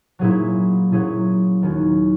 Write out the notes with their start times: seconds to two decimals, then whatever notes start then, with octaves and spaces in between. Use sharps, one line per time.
0.19 A#2 F#3 C#4 E4 G#4
0.92 A#2 F#3 C#4 E4 G#4
1.62 D#2 D#3 F#3 C#4 F#4